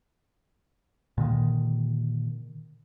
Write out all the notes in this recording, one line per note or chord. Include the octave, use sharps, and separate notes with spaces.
A#2 D3 D#3